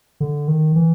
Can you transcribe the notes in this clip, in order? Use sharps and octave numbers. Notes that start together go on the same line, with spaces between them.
D3
D#3
E3